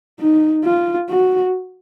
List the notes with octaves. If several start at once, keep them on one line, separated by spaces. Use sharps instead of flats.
D#4
F4
F#4